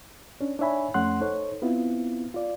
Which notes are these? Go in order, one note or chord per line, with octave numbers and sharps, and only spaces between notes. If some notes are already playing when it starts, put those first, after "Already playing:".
C#4 D4
D4 D#4 C#5 E5 G#5 B5
F2 A3 C#4 F#5 C6 F#6
D#4 A4 C5 C#5
B3 C4 E4 F4
F4 D5